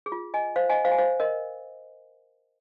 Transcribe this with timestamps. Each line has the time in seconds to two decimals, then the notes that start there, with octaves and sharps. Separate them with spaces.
0.06 G#4
0.12 F4
0.34 D#5 G#5
0.56 C5 F5
0.69 D#5 G#5
0.85 C5 F5
0.91 G#5
0.98 C5 F5
1.20 A#4 D#5